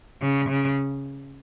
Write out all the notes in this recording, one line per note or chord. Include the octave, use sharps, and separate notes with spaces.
C#3
C#3